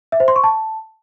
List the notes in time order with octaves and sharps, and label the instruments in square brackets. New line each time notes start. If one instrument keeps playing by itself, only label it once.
[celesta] E5
C5
C6
C#6
A5